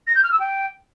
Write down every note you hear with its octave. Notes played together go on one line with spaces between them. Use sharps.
A#6
G6
F6
E6
G5